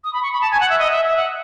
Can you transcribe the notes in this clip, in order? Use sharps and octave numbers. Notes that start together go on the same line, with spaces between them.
D#6
B5
C#6
B5
A5
G#5
F#5
E5
D#5
E5
E5
F#5